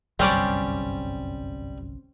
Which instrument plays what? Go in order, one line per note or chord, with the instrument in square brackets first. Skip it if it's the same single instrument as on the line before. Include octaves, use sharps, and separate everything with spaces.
[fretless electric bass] G1 C2 F#2 [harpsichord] G3 [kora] C4 C#4 D5